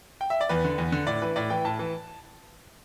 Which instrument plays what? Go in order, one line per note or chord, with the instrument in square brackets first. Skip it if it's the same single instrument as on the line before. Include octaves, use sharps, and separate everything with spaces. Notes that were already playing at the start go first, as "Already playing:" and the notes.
[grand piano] G5
E5
D5
E2 B4
D3
E2
D3
A2 D5
E3 B4
A2 D5
E3 G5
A2 A5
E3